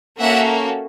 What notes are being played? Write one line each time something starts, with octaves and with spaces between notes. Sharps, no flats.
A#3 C#4 F#4 A4 E5 F#5